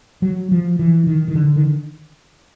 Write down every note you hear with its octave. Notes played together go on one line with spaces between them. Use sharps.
F#3
F3
E3
D#3
D#3
D3
D#3